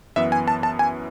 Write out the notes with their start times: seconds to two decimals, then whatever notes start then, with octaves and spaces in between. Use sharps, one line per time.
0.16 F#2 E3 B3 E5
0.32 G#5
0.48 A5
0.63 A5
0.79 G#5